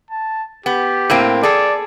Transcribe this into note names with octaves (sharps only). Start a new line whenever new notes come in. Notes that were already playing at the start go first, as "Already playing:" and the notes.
A5
B3 G4
A2 A#3 C4
G#4 A4 D5